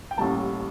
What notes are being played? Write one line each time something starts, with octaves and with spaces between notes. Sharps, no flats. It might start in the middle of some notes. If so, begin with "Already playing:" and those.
G5
A1 A2 G3 A#3 A5